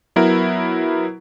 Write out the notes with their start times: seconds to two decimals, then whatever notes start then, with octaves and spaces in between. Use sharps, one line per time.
0.16 F#3 B3 E4 A#4